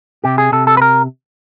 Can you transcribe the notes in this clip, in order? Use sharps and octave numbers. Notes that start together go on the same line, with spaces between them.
C3 G4
G#4
C3 A4
A4
B4
A#4